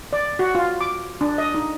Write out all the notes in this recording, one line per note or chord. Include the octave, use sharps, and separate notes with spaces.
D5
F#4
F4
D6
D4
D#5
D#4